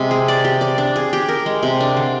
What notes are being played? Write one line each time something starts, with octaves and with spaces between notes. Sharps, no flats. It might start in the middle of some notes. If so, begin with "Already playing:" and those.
Already playing: C3 G#3
G#4
D5
G4
D5
D4
G#4
G4
A#4
G#3
C3
D4
D3